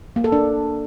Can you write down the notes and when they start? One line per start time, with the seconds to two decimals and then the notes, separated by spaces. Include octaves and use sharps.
0.16 A#3
0.24 A4
0.32 D4